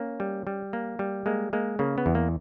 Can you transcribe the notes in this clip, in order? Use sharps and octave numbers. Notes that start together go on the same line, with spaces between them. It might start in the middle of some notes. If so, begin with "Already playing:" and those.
Already playing: A#3 C#4
G3
G3
A#3
G3
G#3 A#3
G#3 A#3
C#3 A#3
B3
E2
A#3